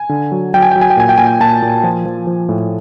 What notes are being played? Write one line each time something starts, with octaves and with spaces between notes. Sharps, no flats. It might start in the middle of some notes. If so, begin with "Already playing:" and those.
Already playing: G#5
D3
F#3
F#3 G5
G#5
F#3 G5
G#5
G5
A#2 G#5
G5
A#2 G#5
G5
A#2 A5
A#2
F3 G#5
F3
F3
A2